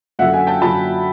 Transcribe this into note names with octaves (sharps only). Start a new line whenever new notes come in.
F#2 D3 F#3 E5 F#5
F#5 G#5
G5 A5
F#2 D3 F#3 A5 B5